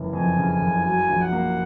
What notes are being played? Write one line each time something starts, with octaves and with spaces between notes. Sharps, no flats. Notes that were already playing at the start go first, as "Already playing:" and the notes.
Already playing: F#1 C#3 E3
F2 G#5
C#3
G#5
F#1
F#3 G#5
A#1
F#5
A#3